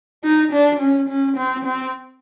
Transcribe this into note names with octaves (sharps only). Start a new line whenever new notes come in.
D#4
D4
C#4
C#4
C4
C4